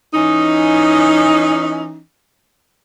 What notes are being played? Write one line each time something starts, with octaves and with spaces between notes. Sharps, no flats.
E3 C#4 D#4